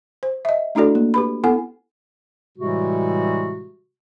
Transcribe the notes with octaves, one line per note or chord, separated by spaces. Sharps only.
C5
D#5 E5
A3 D4 E4 F#4 A4 D5
A#3
G4 B4 B5
B3 E4 A4 F#5 G#5
A2 C3 E3 G3 G#3 F#4